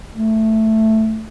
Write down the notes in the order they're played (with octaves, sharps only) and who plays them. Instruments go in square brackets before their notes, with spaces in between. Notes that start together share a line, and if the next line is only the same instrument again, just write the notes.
[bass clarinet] A3